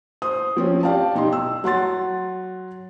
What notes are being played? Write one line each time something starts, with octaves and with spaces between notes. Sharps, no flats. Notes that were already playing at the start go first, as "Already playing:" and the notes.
C5 D#6
F3 C4 C#4
G4 D5 F5 G5 A5
B1 D#4 G4 C6
E6
F#3 F#5 C6 A6